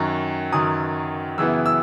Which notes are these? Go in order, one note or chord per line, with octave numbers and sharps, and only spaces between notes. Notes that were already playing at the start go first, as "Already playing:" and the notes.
Already playing: F#2 D#3 F#3 C#6
F#2 D#3 F#3 D#6
F#2 C#3 E3 B3 E4 E6
E6